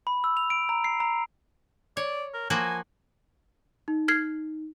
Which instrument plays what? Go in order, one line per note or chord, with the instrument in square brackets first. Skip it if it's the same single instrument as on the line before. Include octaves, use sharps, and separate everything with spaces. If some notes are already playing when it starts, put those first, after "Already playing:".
[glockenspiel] B5
E6
F7
D7
A#5
C7
A#5
[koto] C#5 [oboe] D5
[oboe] A#4
[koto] F3 A#3 F#4 [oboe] G#5
[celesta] D#4
[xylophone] F6 G#6 C7